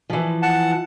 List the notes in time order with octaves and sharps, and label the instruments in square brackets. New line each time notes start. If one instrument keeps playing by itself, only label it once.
[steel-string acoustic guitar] E3 F3
[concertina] F#5 A5